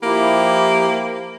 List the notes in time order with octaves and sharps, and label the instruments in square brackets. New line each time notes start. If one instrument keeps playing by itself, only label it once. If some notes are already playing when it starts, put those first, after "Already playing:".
[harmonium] F3 E4 G4 [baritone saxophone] A#3